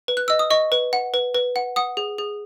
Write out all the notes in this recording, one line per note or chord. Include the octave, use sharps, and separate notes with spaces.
B4
F#6
D#5 E6
D#6
D#5 C#6
B4
F#5
B4
B4
F#5
F#5 D#6
G#4
G#4